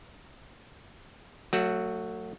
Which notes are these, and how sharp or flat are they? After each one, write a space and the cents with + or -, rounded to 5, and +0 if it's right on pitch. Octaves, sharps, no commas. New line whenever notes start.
F#3 +0 A3 +35 F#4 +0